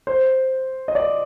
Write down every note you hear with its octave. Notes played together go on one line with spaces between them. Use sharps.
C5
D#5
D5